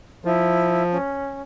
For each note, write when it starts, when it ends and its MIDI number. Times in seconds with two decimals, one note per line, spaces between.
0.25 0.98 53
0.25 0.84 64
0.92 1.42 61